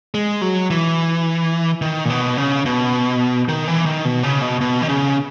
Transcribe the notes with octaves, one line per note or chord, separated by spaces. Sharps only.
G#3
F#3
E3
D#3
A#2
B2
C#3
B2
D#3
E3
D#3
B2
C#3
B2
B2
D#3
C#3